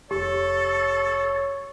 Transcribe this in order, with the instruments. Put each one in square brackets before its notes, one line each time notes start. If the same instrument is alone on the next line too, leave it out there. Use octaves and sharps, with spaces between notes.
[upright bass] F1 [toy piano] G4 [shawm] A4 [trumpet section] C#5